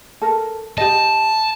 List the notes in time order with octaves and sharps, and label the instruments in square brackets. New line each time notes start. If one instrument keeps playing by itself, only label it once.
[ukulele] A4 A#4
[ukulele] G4 D#5 [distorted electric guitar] A5